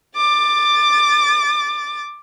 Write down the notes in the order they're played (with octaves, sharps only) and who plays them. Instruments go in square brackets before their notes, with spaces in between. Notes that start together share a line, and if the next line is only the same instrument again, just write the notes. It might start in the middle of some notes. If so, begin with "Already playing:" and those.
[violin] D6 A6